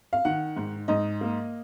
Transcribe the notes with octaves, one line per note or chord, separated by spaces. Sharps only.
F5
D#3 F#5
G#2
G#2 D#5
A#3